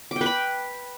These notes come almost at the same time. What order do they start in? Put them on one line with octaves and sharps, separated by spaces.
D6 G5 B4 B5